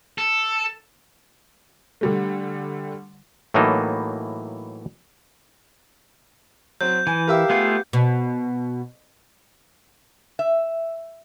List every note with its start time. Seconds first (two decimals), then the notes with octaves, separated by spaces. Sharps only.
0.18 A4
2.01 D3 G3 A3
3.54 A2 E3 F#3 A#3 D#4 A4
6.81 F#3 C4 G6
7.07 E3 G#5
7.27 G4 A#4 E5 F5 E6
7.50 A3 B3 F4 G#4
7.93 B2
10.39 E5